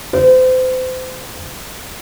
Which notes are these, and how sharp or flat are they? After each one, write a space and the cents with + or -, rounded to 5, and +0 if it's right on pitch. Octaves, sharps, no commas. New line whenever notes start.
C5 -35